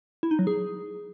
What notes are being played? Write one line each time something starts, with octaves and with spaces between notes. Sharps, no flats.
E4
D#4
F#3
G#4